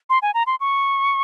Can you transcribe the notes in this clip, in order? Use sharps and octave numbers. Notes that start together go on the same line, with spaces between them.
C6
G#5
A#5
C6
C#6